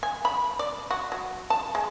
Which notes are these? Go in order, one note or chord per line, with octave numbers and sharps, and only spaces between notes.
G#5
B5
D5
F#4
F#3
A5
G#3